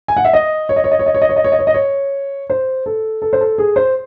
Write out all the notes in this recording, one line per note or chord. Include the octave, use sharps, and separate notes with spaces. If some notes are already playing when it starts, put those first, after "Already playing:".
G#5
F#5
E5
D#5
C#5
D#5
C#5
D#5
C#5
D#5
C#5
D#5
C#5
D#5
C#5
D#5
C#5
D#5
C#5
C5
A4
A4
C5
A4
G#4
C5